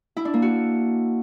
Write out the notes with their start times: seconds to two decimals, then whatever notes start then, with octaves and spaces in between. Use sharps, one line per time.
0.17 E4
0.25 D4
0.34 A#3
0.42 F#4